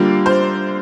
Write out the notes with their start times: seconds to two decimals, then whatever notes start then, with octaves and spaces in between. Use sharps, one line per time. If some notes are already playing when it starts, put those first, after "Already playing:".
Already playing: D3 G3 A#3 F4
0.26 C5